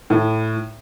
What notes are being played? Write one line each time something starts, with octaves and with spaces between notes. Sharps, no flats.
A2